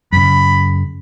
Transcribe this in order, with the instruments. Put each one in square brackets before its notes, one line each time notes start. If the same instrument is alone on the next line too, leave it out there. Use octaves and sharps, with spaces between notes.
[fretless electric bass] F#2 C#3 [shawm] B5